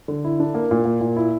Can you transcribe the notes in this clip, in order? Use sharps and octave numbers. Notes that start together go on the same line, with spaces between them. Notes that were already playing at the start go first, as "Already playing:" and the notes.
D3
E4
D4
A#3
A#2
A#3
A#2
E4